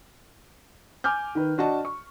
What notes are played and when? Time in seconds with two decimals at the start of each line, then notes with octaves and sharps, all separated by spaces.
1.04 G#5 D6 F6 G6
1.35 D#3 B4
1.58 D4 F#4 D#5 A5
1.85 C#6